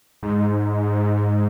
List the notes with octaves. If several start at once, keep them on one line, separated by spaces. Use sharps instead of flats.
G#2